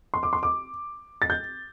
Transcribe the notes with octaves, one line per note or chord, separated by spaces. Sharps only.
C6
D6
C6
D6
A6
G6